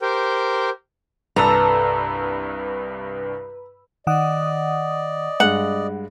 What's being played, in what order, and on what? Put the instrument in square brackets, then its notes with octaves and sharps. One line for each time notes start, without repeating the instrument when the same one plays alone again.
[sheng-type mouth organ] G4 A#4 C5 G5
[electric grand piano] C2 G2 E6 [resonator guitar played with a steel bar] G3 A4 [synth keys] B4 [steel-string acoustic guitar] A#5
[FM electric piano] D#3 F#5 D#6 [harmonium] D5 D#5
[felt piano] G2 G#3 [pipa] F#5